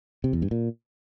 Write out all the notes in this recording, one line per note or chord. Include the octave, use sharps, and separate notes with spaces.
C3
E2
G2
A#2